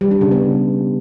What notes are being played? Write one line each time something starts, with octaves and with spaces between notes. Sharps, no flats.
G3
D4
C#3
B3